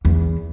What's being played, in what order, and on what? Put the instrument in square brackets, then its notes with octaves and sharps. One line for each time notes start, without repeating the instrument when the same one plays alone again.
[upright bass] E2